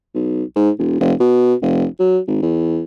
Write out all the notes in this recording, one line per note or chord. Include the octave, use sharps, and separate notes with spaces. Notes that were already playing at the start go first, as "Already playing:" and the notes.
B1
G#2
E1
F1
B2
F1
F#3
G#1
E2